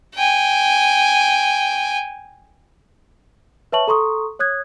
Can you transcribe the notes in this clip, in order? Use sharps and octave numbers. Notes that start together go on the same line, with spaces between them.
G5 G#5
B4 C#5 E5 A5 C#6 F#7
A4 A#5 C6 C#6 D#6
C#5 D#6 F#6 G#6